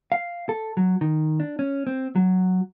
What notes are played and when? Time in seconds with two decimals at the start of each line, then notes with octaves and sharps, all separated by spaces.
0.12 F5
0.49 A4
0.77 F#3
1.01 D#3
1.40 D4
1.59 C#4
1.87 C4
2.16 F#3